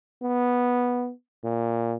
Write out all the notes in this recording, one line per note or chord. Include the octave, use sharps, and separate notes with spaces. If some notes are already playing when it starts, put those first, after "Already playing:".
B3
A#2